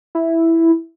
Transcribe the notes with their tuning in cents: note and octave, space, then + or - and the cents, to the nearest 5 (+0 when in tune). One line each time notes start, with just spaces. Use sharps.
E4 +0